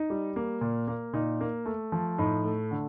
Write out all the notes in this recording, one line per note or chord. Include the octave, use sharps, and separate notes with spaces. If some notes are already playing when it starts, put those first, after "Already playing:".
Already playing: D#4
G3
A#3
A#2
A#3
A#2 D#4
A#3
A3
F3
A2 D#4
A3
D3